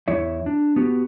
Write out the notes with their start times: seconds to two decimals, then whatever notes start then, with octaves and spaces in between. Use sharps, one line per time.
0.08 E2 E4 C#5 E5
0.46 D4
0.76 B3 F#4 G4